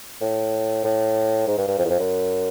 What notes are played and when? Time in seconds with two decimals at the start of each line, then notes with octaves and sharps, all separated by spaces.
0.21 A2
0.84 A2
1.47 G#2
1.58 G2
1.68 G2
1.78 F2
1.85 E2
1.89 F2
2.00 F#2